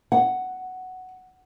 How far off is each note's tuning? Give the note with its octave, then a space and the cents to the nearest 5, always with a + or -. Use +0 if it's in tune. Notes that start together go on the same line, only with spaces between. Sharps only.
F#5 +5